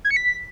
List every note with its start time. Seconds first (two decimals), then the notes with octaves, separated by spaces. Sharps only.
0.05 G#6
0.11 C#7
0.16 B6